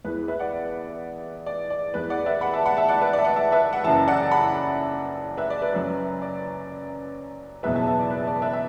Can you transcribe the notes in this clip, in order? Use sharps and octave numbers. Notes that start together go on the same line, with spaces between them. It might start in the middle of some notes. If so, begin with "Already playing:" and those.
E2 E3 B4
B4 E5
D5 F#5
D5
D5
E2 E3 B4
D5 F#5
B4 E5
F#5 B5
E5 A5
F#5 B5
E5 A5
D5 F#5
B4
D5
E5
D5 F#5
E5 A5
B4 E5
F#5
F#1 F#2 E3 E5 A5
D5 F#5
F#5 B5
B4 E5
D5
B4
F#1 F#2 F#3
D5
F#1 E2 B2 F#3 B4 E5
E5 A5
E5 A5
D5
B4
D5
B4 E5
E5